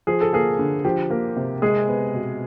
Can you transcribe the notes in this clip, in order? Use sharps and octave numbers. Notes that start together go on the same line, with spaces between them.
F3 G#4
A4
A#3 G#4
D3
F3 G4
A#3
C3
G#3 G#4
B3
B2